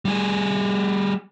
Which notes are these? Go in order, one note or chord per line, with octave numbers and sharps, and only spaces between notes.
G3 G#4